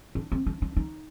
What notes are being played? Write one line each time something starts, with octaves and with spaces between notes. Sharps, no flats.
D4
C4
D4
D4
D#4